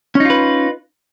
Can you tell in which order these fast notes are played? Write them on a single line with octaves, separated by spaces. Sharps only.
C#4 D#4 F4 B4